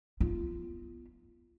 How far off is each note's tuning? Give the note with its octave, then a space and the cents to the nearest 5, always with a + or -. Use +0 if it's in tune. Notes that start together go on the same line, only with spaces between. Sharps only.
B3 -10 F4 -25